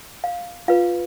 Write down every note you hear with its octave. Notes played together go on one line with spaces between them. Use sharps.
F5
F4 B4 F5